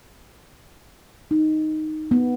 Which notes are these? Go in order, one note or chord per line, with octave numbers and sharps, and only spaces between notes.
D#4
B3